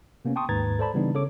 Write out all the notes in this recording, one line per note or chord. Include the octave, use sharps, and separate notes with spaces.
C3 A#3 B3 C#4
G5 A5 C6 C#6 D#6
D#2 G#2 B4 A#5 G#6 A6
A4 C5 D5 A5 B5
C#3 E3 G3 B3 D4 D#4
C#3 A4 C#5 D6